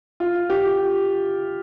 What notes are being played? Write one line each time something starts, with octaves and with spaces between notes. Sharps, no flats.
F4
G4